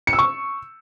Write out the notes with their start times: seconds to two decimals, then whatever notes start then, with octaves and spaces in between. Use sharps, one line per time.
0.07 C#7
0.13 E6
0.19 C#6